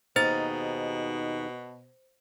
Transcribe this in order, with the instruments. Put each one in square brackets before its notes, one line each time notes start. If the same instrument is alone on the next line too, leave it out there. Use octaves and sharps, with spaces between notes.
[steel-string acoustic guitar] D#2 D#4 G#4 [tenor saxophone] B2 [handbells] C5 A6